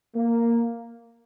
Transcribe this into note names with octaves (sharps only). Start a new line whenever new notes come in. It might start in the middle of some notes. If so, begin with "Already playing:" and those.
A#3